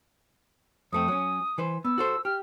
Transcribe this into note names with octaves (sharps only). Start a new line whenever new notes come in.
F2 A3 C4 D#6
F#3 C#4
E3 B4 C5
B3 E6
F#4 A4 C5
G4 F6